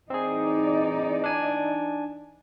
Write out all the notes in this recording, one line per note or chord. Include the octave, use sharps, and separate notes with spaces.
E3 C4 D#4 G#4 D5
D4 G#5